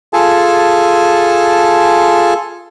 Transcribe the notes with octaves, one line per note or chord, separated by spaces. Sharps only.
F4 G#4 A4 G#5 A5